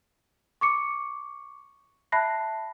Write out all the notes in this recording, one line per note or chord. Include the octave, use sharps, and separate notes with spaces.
C#6 D6 C#7
E5 A5 B5 F#6 A#6 C7